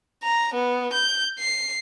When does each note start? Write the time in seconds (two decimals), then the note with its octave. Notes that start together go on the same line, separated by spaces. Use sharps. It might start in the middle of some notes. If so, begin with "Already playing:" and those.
0.24 A#5
0.54 B3
0.93 G6
1.39 C7